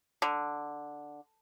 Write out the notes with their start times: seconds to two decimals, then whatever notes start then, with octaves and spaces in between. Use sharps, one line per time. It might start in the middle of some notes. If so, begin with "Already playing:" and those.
0.22 D3